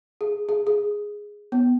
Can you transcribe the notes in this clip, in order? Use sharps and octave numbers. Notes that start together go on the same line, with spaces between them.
G#4
G#4
G#4
B3